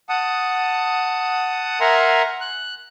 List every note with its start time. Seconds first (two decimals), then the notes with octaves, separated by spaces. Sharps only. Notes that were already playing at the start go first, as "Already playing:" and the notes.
0.09 F#5 A5 D#6
1.80 A#4 E5 F#5 G#5 A#5 C6
2.41 F#6